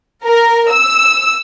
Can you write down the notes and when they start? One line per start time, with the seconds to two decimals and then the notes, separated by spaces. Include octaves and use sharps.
0.25 A#4
0.70 E6